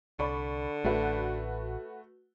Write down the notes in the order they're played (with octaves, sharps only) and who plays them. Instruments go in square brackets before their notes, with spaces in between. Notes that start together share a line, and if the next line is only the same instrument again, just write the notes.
[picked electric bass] C2 [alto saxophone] D3 [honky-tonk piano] D5 B5 C#6
[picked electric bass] A1 [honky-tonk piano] A3 F#4 B4